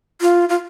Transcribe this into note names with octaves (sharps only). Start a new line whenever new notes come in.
F4
F4